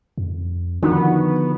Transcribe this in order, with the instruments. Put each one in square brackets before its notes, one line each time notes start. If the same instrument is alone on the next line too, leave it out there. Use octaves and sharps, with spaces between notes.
[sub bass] F2
[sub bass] D3 [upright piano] D#3 [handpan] F3 D4 F#4 [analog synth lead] B3